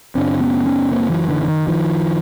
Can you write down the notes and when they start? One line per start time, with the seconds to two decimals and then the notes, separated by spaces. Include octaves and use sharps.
0.15 F#2 C#3 C4 D4
0.40 B3 C#4
0.66 B3 C#4
0.92 A#3 C4
1.10 E3 F#3
1.29 D3 E3
1.42 D3
1.48 D#3
1.67 D#3 F3